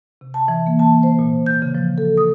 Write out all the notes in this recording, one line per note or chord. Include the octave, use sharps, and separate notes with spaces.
C3
A5
E3
A#3
A5
C5
A#2
G6
C#3
F3
A4
D#6